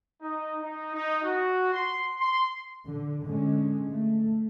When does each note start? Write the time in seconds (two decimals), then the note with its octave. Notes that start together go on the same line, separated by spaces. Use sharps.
0.21 D#4
0.61 D#4
0.93 D#4
1.22 F#4
1.72 C6
2.19 C6
2.86 D3
3.26 D3 G#3 C#4
3.91 A3